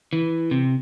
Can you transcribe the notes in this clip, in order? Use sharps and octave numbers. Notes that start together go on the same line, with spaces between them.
E3
C3